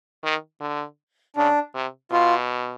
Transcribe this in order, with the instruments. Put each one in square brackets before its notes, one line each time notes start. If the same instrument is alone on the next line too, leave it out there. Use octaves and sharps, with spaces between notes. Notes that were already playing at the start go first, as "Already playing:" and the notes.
[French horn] D#3
D3
[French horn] C#3 [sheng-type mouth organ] D4
[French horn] C3
[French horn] B2 [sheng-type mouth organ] F4